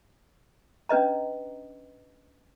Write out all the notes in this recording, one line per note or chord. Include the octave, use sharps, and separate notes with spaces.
C#4 D4 B4 D#5 A#5